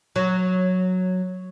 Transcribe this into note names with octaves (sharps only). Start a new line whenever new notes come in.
F#3